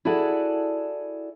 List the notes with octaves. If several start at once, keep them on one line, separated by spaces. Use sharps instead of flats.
E4 F#4 G#4 A4 D5 F#5